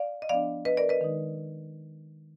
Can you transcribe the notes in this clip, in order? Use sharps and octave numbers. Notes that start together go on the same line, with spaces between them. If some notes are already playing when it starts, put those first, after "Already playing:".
Already playing: D5 F5
D#5
F3 B3 D4 D5 F5
B4 D#5
A#4 D5
B4 D#5
D#3 G#3 D#4